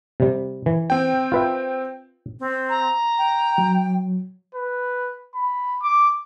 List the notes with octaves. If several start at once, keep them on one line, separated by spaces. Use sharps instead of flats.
C3 G3
E3
C4 G5
F4 B4 E5
C4
A#5
G5
F#3
B4
B5
D6